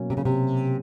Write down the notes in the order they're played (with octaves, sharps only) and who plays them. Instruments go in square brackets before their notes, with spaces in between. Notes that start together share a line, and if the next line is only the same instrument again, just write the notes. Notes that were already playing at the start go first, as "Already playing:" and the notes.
Already playing: [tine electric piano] B2 F#3 A#3 C#4
[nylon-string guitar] C3
C#3
C3